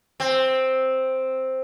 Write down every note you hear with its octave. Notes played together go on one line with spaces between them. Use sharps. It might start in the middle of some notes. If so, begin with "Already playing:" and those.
C4